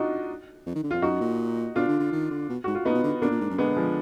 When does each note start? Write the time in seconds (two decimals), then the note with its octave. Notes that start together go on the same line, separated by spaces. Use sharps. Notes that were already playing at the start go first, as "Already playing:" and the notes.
Already playing: D4 D#4 F4 F#4
0.66 F2
0.75 D#3
0.84 D3
0.91 F2 F4
1.02 F#2 D#4 F#4
1.21 A#2
1.76 B2 D4 F4
1.88 D3
1.99 D3
2.12 D#3
2.30 D3
2.49 B2
2.64 G#2 F#4
2.75 F4
2.85 A#2 B3 D#4
2.94 B2
3.04 D3
3.22 B2 A#3 D4
3.31 A#2
3.41 G#2
3.50 F#2
3.58 D3 G#3 B3
3.76 F3 G#3